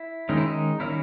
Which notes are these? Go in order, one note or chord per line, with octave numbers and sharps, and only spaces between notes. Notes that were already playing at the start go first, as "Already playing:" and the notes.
Already playing: E4
D#3 G#3 C#4 D#4
E4
D#4
D#3 G3 A#3 C#4 E4